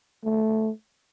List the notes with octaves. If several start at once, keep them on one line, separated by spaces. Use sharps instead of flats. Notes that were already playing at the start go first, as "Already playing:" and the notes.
A3